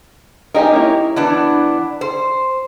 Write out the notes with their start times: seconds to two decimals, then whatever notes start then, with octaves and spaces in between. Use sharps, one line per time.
0.54 D#4 G4 A#4 D#5 G#5
0.72 A#3 C#4 E4
1.16 E3 B3 D4
2.01 C5